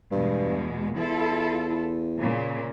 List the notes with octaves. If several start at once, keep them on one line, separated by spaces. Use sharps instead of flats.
E2 G2 B2 G#3
E2 E4 F4 A4
A#2 C#3 A#3